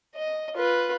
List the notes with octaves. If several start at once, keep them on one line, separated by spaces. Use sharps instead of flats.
D#5
F4 B4